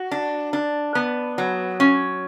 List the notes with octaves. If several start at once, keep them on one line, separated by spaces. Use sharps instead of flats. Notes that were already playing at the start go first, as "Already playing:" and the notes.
Already playing: F#4
D4
D4
B3
F#3
C#4